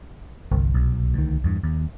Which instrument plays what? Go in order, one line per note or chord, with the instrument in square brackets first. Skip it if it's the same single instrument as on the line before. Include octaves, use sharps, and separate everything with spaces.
[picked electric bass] G1 [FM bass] C2
[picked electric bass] B1
D2 D#3
E2 G2
D#2